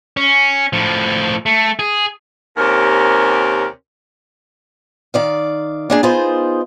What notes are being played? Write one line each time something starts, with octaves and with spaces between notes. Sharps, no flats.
C#4
A2 F3
A3
G#4
D#2 C3 C#4 A#4
D#3 D5 F5
A#3 D4 G#4
B3 D#4 F4 G#4 C5